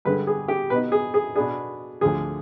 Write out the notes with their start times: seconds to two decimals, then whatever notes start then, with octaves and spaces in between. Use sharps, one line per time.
0.05 G2 D3 G#3 B4
0.27 G#4
0.48 G4
0.70 B2 B3 D#4 B4
0.92 G#4
1.14 G#4
1.36 B2 B3 D4 G#4
2.01 D2 D3 F3 G#4